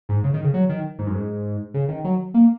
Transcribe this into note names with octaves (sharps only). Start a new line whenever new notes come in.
G#2
C#3
D#3
C#3
F#3
D#3
G#2
F#2
G#2
C#3
D#3
F#3
A#3